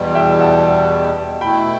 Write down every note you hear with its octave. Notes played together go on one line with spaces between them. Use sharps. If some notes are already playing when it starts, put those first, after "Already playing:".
Already playing: E2 B2 G3
E5 G5
F#5 A5
B2 A3 E4 G5 B5